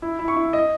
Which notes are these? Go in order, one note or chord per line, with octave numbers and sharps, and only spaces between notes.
E4
E4
C#6
E4
D#5